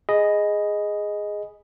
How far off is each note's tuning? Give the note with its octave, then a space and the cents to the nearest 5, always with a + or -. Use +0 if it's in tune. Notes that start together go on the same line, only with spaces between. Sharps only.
G#4 +0 D#5 +0 B5 +0